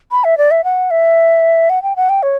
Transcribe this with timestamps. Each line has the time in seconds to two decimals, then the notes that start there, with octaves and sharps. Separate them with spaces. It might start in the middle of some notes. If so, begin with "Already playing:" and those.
0.11 B5
0.24 E5
0.38 D5
0.51 E5
0.64 F#5
0.91 E5
1.70 F#5
1.83 G5
1.96 F#5
2.09 G5
2.23 C#5